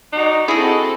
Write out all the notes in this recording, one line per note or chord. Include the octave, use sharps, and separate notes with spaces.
D#4 F#4 D5
C4 E4 F#4 G#4 A4 D#5